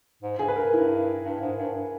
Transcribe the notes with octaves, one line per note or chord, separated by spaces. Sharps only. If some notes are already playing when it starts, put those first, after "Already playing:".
G#2
G2 G#4
B4
A#4
G2 E4
G2
G#2
G2